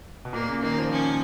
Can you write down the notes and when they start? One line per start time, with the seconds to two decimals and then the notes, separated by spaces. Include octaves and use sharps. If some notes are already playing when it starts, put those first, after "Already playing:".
0.25 B2
0.33 A#2 A#3
0.48 C#3
0.63 D#3 A#3
0.78 F3
0.93 C#4